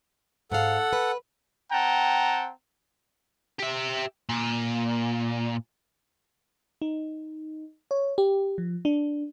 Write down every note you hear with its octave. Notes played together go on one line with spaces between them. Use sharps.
G#2 A4 F5 F#5
B4
C4 F#5 G5 A5 A#5
G4 E5
A#2
D#4
C#5
G4
F3
D4